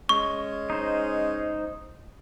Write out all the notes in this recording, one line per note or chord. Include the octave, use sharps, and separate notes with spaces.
G#3 C#4 C#6
D#4 C5